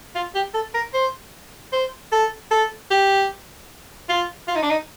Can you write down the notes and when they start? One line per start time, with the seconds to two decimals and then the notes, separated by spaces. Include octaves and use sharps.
0.15 F4
0.35 G4
0.54 A4
0.74 A#4
0.94 C5
1.72 C5
2.12 A4
2.51 A4
2.91 G4
4.09 F4
4.48 F4
4.55 D#4
4.62 D4
4.70 D#4